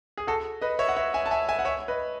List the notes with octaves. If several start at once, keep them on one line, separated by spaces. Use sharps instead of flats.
G#4
F#4 A4
B4 D#5
C#5 E5
F#5
C#5 E5
E5 G#5
A5
E5 G#5
E5 G#5
F#5
C#5 E5
B4 D#5